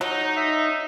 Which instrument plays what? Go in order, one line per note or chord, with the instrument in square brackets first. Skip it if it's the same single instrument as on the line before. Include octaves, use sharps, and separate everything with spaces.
[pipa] F#3 [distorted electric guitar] D#4
[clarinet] E5